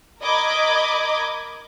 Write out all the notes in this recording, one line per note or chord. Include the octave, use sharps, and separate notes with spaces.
A#4 D#5 B5 D6 G#6